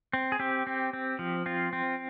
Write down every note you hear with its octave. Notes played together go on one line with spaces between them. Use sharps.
C4
G#4
C4 G4
C4
C4
F3
C4 F4
C4